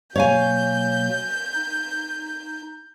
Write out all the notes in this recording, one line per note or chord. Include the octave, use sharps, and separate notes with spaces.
B2 F#3 A#3 C#5 F5 G#5 G6
D#4